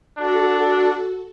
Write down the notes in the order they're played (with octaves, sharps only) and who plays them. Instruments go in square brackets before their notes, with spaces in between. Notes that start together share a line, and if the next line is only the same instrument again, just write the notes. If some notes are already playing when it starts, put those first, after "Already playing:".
[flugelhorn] D4 [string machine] F#4 A4